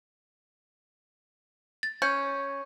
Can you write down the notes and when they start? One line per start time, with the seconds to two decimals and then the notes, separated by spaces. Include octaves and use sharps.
1.83 A6
2.02 C#4 C#6 G6 C#7